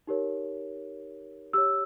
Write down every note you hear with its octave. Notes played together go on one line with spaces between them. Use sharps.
D#4 G4 A#4 C#5
G4 C#5 E6